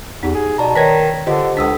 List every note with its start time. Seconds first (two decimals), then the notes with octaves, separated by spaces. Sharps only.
0.23 E2 D#4 G4
0.35 G#4
0.58 B2 D5 A5 A#5
0.76 D#3 B4 C#5 D#5 G#6 A#6 B6
1.27 D3 F4 G4 C5 D#5
1.57 C#2 D4 A4 D#6 E6 B6